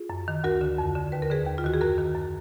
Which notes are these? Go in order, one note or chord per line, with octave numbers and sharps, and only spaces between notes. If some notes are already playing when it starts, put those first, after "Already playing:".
Already playing: F4 G#4
F#2
D#3
D2 F#4 A#4
D3
F2
D3
D#2 B4
A#4
D3 G#4 B4
D#2
F4
D#3 F#4
G#4
F#2 F#4 A#4
D#3
F#2